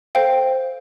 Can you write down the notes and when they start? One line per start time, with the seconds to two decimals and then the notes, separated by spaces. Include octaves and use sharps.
0.15 A4 C5 F5 G5